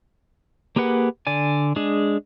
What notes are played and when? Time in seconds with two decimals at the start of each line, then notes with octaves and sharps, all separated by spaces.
0.76 A#3 G4 G#4 B4 F#5
1.27 D3 D5 G#5
1.76 G#3 D4 G#4